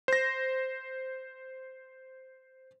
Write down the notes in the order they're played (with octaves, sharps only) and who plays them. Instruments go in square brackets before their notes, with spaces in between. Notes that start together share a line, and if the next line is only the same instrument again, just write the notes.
[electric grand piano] C5 A#6